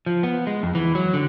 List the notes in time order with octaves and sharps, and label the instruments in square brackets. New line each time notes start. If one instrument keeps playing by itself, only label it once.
[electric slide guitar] F3
B3
G#3
F2
E3
F#3
D3